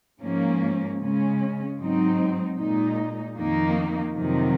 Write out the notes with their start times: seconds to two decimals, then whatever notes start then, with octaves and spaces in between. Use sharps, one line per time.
0.21 G#2 F3 A#3 C#4
1.00 C#3 G#3 C#4
1.79 G#2 F#3 C4 D#4
2.57 A#2 G#3 D#4
3.36 F2 D#3 A#3 D#4
4.15 F2 C3 D#3 F#3